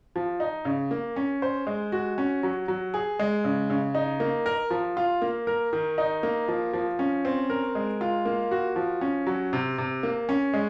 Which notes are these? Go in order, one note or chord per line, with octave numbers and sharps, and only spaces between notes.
F3
D#4
C#3
A#3
C#4
C5
G#3
F#4
C#4
F#3
F#3
G#4
G#3
C#3
C#3
D#4
A#3
A#4
F3
F4
A#3
A#4
D#3
D#4
A#3
F3
F3
C#4
C4
A#4
G#3
F4
A#3
F#4
F3
C#4
F#3
C3
C3
A#3
C#4
G#3